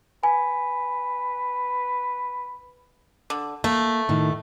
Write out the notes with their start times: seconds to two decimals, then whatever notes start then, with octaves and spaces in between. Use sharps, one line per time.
0.23 B4 G#5
3.30 D3
3.64 A3 A#3
4.09 A2 D#3